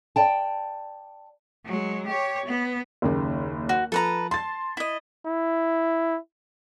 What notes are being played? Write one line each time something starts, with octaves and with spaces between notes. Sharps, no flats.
D5 G5 A5
F#3 G#3
G4 C#5
B3
F#1 D#2 C#3
F#4
F3 A4 B4 A#5
A5 C6 A6
E4 D#5
E4